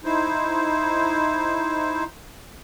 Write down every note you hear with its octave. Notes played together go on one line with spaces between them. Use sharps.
D#4 E4 C5